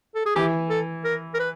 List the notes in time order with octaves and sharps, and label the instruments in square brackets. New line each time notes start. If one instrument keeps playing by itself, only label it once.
[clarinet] A4
G#4
[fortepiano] E3 [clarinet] G4
[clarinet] A4
A#4
A#4
B4